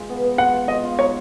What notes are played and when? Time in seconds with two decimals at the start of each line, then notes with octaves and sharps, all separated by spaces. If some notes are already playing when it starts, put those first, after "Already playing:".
Already playing: G#3 F4
0.10 B3
0.24 B3
0.38 F4 F#5
0.54 F4
0.68 F4 D#5
0.84 F4
0.99 D#4 C#5